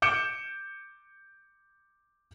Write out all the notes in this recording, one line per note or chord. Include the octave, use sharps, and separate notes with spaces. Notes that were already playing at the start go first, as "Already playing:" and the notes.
D6 G6 C#7 D7 E7